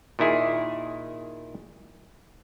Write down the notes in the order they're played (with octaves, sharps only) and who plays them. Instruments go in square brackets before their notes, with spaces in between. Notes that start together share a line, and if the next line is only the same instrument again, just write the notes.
[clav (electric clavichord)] A#2 D#3 E4 G#4